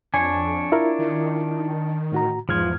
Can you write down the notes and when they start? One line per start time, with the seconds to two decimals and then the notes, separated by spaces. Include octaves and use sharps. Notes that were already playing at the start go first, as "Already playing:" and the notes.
0.14 F2 D4 C#5 G#5
0.72 E4 F4 A#4
0.99 D#3
2.12 A2 F#4 A#5
2.49 E2 G#2 F3 F6 G#6